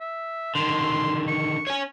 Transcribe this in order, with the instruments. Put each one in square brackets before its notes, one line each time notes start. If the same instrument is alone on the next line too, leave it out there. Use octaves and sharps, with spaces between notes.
[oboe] E5
[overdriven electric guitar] D3 D#3 [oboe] C6
[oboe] C#6
[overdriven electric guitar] C#5 G#5